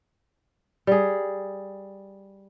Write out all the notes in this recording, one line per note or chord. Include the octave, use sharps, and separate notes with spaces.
G3 G#4